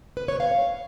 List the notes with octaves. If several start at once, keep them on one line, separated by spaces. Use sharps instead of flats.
B4
C#5
F5